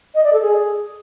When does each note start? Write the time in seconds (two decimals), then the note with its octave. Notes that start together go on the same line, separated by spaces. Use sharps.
0.15 D#5
0.24 D5
0.33 A4
0.42 G#4